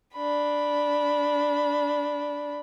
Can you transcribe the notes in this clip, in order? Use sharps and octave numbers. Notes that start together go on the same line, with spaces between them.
D4 B5